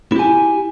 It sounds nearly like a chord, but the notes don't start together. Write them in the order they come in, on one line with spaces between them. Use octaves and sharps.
E4 G4 G#5